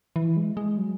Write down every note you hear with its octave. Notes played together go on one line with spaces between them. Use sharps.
E3
G#3
G#3
F#3